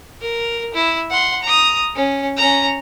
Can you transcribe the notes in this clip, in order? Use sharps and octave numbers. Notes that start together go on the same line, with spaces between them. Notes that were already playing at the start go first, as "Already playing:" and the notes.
A#4
E4
F#5 C6
A#5 D#6
C#4
C#4 A#5